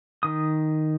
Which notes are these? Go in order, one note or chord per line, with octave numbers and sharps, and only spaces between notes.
D#3 D#6